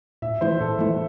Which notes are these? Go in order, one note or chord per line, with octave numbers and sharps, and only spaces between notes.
A2 E5
E3 A3 E4 C5
A2 A4
E3 A3 E4